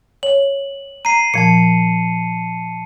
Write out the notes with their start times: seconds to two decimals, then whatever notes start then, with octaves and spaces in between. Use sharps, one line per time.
0.23 C#5 F#7
1.05 A#5 C7 D#7
1.34 A#2 F3 A5 C#7